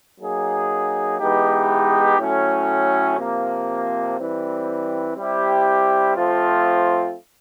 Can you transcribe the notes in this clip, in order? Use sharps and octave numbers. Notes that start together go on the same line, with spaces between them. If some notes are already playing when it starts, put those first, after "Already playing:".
F#3 A#3 D#4 G#4
E3 G#3 B3 D#4 G4
A2 F#3 A3 C#4
C3 F3 A#3
E3 G3 C4
G3 C4 E4 G4
F3 A3 C4 F4